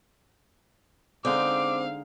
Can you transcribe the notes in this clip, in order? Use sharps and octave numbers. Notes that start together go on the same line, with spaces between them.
D3 G#3 C4 D#4 F5 D6